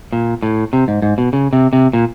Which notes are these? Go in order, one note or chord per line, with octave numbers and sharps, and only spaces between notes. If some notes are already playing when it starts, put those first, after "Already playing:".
A#2
A2
C3
G#2
G#2
B2
C#3
C3
C3
A#2